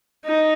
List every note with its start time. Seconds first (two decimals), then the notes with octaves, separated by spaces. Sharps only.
0.25 D#4